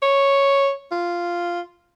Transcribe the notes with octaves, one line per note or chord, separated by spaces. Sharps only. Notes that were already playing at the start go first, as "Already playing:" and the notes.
C#5
F4